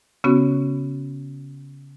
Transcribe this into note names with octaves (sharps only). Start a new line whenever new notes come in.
C#3 B3 C#4 F#4